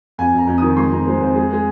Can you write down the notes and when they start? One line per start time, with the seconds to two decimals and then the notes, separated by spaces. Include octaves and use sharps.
0.18 F2 G#5
0.34 F2 A#5
0.47 F2
0.58 D#3 D#6
0.77 G#3 C6
0.92 F2 A#5
1.06 G#3 C5
1.21 F2 C5
1.35 G#3 G#4
1.50 G#3 G#4